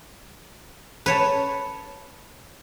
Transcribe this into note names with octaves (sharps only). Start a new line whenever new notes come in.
B4 C#5 A5